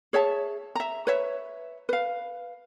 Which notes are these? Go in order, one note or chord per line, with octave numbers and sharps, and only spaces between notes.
G#4 C#5 E5 A5
E5 A#5
B4 C#5 E5
B4 F5